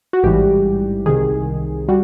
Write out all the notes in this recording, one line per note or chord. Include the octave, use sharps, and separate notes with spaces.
F#4
A1 G#2 E3 G3 G4
C2 C3 D#3 G#4
G3 F#4